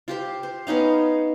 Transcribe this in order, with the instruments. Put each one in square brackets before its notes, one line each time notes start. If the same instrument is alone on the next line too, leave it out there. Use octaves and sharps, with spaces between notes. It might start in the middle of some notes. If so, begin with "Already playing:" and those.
[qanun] F4 G4 C5
C5
B3 C#4 D#4 F5